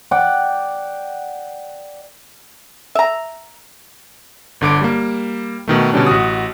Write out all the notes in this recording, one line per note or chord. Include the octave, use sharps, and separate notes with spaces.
D5 F#5 G5
E5 A#5
G1 D3 D6 D7
G3 A#3
B2 D#3 A3
B2 D3 G3 C#4 D4
A1 F#4 D#6